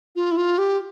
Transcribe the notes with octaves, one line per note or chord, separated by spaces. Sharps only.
F4
E4
F4
G4